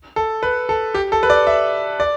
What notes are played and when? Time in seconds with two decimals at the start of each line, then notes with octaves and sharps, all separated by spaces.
0.16 A4
0.43 B4
0.69 A4
0.94 G4
1.12 A4
1.23 B4
1.30 D5
1.47 E5
2.00 D5